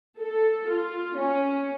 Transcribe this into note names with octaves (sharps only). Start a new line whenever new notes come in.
A4
F4
C#4